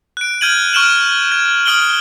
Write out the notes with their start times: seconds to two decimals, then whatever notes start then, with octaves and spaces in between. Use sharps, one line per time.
0.17 F#6 D7
0.41 F6 G6 G#6 D#7 F#7
0.73 C#6 F6 D7 E7 F#7
1.32 G#6
1.66 D#6 F6 D7 F#7 G7